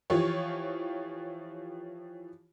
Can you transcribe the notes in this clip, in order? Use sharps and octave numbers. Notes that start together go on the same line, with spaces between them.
E3 F3 F4 G4 C#5